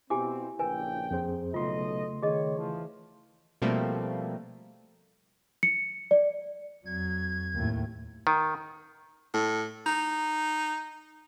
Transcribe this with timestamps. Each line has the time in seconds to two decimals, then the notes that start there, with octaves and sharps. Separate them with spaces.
0.10 B2 C4 E4 G4 G#5 D6
0.59 A#1 C#3 A#4 B4 G5 G#5
1.11 F2 G#4 C5
1.54 B1 C#3 A3 F4 A4 D#5 C6
2.23 D#3 G#4 C#5 D#5
2.58 E3 F3
3.62 B2 F3 G3 A3 A#3 C4
5.63 C#7
6.11 D5
6.86 F2 F#3 G#6
7.55 D#2 A2
8.27 D#3
9.34 A2
9.86 D#4